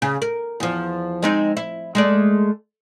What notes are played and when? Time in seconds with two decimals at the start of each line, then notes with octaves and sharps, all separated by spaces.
0.02 C#3
0.22 A#4
0.60 E2 F3
1.22 G#3 C4 D#4
1.57 E4
1.95 G#3 A3 D5